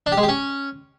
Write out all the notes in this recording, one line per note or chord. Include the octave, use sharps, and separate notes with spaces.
D4
G4
G#3
G4
C#4